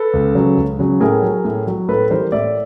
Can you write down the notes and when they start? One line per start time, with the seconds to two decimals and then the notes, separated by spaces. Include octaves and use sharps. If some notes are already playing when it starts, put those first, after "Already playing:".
Already playing: A4 B4
0.13 C#2
0.35 C#3 F#3
0.57 C#2
0.79 C#3 F#3
1.00 A2 G#4 A#4
1.22 F#3
1.45 A2
1.67 F#3
1.88 A2 A4 B4
2.11 E3 G3 A#4 C5
2.32 A2 D5 E5